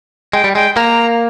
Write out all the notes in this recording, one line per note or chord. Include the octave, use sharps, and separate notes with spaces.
G#3 G5
G3
G#3 G5
A#3 A#5